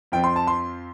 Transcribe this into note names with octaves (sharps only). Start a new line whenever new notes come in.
F2 F3 C4 G5
C6
A5
C6